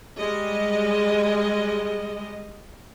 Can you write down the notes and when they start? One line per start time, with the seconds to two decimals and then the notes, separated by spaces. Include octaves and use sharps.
0.18 G3 G#3 D#5